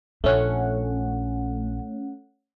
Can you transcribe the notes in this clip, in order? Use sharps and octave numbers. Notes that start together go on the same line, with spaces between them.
A#1 A3 C#4 D4 F#5